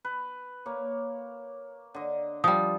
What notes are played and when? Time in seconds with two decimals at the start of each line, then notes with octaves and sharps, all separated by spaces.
0.05 B4
0.66 A#3 C#5
1.94 D3 D#5
2.44 F3 G3 D#6